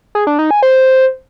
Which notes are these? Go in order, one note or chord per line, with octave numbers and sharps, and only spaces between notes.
G#4
D4
D#4
G#5
C5